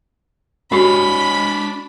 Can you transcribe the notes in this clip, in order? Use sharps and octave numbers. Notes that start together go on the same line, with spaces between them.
G#3 D4 F#4 G4 C#5 B5